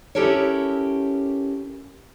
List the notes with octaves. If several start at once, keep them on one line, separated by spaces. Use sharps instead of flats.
C#4 E4 G4 A4 A#4 C#5